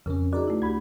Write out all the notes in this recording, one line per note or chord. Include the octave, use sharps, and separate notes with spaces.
F2 C#3 C#4 A#4
D#4 F#4 G#4 A#4 D5
A3 E4
D2 G4 B5 G#6